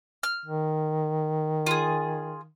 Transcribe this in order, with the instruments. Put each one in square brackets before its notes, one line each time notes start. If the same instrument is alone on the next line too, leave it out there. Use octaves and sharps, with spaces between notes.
[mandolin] F6
[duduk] D#3
[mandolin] F4 G#4